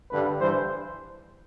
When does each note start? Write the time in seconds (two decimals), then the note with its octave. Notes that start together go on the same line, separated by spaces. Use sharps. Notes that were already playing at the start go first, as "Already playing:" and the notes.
0.11 G2 D3 G3 B4
0.40 G2 E3 G3 C5